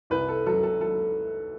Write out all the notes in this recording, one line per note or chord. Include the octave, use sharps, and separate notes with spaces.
C2 B4
A4
F#3 A4
A4
F#3 A4